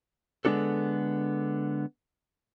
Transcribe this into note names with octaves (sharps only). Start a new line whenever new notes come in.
D3 G#3 B3 D4 F#4 A4